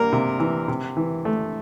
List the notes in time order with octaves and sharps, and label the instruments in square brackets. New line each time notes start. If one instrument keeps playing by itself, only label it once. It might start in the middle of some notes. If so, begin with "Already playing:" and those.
Already playing: [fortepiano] G3 A#3 A#4
C3
E3
C3
E3
A3